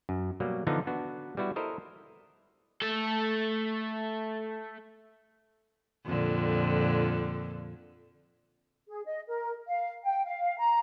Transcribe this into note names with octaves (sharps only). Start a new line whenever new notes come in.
F#2
B2 F#3 G3 A#3
D3 E3 F3 B3 D4 D#4
B3 D4 F#4
G3 B3 E4 F#4
E4 A4 A#4 C5 D#5
A3 A4
F2 A#2 D3
G#4
D#5
A#4
F5
G5
F5
A#5